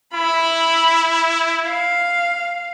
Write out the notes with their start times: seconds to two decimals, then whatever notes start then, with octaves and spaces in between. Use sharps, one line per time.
0.14 E4 B5
1.68 F5